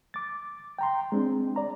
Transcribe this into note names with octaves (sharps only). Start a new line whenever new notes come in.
D6 A6
G5 A#5 C6
G#3 C4 D4
D5 A#5